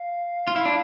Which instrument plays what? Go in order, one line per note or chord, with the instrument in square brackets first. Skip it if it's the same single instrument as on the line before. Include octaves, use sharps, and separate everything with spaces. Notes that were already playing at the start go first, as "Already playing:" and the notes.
Already playing: [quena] F5
[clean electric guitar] F4
E4
D4